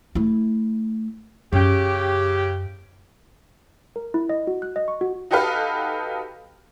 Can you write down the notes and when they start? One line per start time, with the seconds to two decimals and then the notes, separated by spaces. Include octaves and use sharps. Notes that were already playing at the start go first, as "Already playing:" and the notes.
0.15 A3 E4
1.53 F#2 C#3 G4
3.96 A#4
4.14 E4
4.29 D#5
4.47 F#4
4.62 F#6
4.76 D#5
4.88 C#6
5.01 F#4
5.31 D#4 F#4 G4 A4 B4 F5